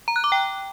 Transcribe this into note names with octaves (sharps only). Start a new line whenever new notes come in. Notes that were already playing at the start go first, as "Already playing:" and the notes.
A#5
F#6
D6
G5